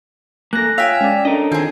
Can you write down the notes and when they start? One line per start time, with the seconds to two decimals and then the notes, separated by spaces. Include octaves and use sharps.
0.53 A#3 A4 G#5 F#6 A#6
0.78 F4 C#5 E5 F5 G5 G#5
1.01 G#3 C#4 D5
1.25 C#4 D4 A4 A#4 D#5
1.52 D#3 C4 D#4 F4 G#4